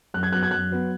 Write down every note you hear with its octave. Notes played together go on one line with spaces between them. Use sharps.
F#2 F#6
G#6
F#3 B3 F#6
G#6
F#2 F#6
F#3 B3